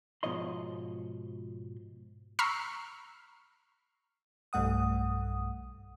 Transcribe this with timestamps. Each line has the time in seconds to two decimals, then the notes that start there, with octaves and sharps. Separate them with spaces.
0.23 G#2 B2 F3 C#5 D#5 C6
2.39 A#5 B5 C#6 E6 F6 C7
4.53 B1 G2 A3 F#5 D#6